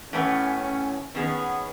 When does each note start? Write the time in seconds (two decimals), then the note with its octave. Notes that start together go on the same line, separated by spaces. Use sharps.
0.13 A2 E3 B3 C#4
1.15 D#3 F#3 B3 C#4 G#4